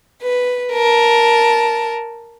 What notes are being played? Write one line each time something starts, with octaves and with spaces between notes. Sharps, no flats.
B4
A#4 A5